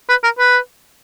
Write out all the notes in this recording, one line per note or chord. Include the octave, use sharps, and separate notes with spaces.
B4
A#4
B4